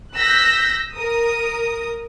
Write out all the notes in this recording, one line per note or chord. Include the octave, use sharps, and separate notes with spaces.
E6 F#6 G6 A#6 B6
A#4 D#6